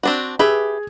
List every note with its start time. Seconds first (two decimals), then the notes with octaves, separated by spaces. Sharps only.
0.03 C4 D4 F#4
0.39 G4 G#4 B4 E5